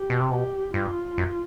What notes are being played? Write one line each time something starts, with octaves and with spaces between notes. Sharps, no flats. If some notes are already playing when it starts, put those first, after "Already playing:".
Already playing: G4
B2
C3
B2 G4
G2 F4
F#2